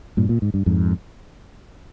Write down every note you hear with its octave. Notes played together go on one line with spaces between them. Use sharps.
G2 A#2
A#2
G#2
G2
F2 G#2